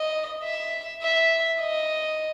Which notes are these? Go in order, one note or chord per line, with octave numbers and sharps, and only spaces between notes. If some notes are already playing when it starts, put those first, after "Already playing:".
Already playing: D#5
E5
E5
D#5